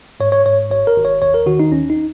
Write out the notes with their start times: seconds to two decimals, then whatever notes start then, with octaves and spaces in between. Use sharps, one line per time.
0.20 G#2 C#5
0.32 C#5
0.46 G#2 C#5
0.70 G#1 C#5
0.87 A#4
0.97 G#1
1.05 C#5
1.22 D#2 C#5
1.34 A#4
1.46 D#3 F#4
1.60 D#4
1.72 D#2 C#4
1.90 D#4